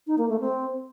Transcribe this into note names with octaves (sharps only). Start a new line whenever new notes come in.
D#4
A#3
A3
C4